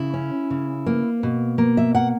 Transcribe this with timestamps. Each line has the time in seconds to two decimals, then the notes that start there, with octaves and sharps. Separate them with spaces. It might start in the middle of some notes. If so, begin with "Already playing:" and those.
Already playing: C#3 E4
0.14 C#4
0.50 C#3
0.86 A#3
1.23 B2
1.58 A#3
1.77 E5
1.95 A#3 F#5